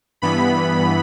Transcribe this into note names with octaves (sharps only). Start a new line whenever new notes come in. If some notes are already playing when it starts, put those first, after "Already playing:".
G2 E3 B3 B5